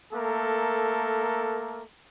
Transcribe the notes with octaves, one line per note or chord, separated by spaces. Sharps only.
A3 A#3 A4 A#4